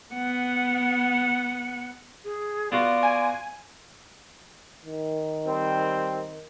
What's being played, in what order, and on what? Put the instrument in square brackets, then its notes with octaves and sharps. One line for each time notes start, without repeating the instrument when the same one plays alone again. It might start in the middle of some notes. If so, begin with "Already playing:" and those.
[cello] B3 F#5
[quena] G#4
[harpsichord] B3 F4 F#4 [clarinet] D5 [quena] C6
[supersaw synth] G#5
[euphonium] D#3
[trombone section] G3 C4